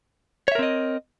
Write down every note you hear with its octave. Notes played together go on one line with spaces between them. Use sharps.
C4 A#4 C#5 D#5 E5